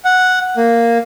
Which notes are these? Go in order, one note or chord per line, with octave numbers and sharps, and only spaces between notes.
F#5
A#3